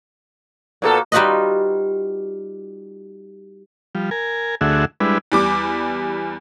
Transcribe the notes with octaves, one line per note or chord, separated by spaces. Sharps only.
A#2 A#3 B3 F#4 A4
G3 D#4 F4 F#4 B4 D#5
F3 G3
A#4 G#5
D2 D3 A3 F#4 G#4 E5
G3 G#3 D4 E4 B4
E2 G3 D6